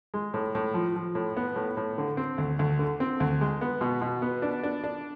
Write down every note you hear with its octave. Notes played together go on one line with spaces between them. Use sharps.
G#3
A2
A2
F3
F3
A2
B3
A2
A2
D3
C4
D2
D2
D3
C4
D2
G#3
B3
B2
B2
B3
D4
D4
D4